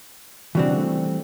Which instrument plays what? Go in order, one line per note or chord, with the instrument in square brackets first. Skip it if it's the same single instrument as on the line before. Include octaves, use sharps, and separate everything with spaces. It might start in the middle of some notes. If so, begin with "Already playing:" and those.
[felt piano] C#3 D4 F#4 [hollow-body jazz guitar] E3 G3 C4
[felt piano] A3